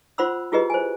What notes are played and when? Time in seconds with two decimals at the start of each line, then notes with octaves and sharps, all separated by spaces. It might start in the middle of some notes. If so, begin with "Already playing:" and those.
0.18 F4 C5 F#5 B5 C6 E6
0.52 E4 F4 G4 G#4 B4 D#5
0.70 C5 G#5